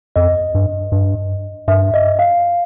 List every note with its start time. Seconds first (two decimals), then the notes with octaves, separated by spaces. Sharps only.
0.16 F2 D#5
0.55 G2
0.92 G2
1.68 G2 E5
1.94 D#5
2.19 F5